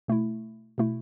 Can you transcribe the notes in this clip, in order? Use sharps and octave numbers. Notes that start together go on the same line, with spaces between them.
B2 A3 E4
B2 A3 E4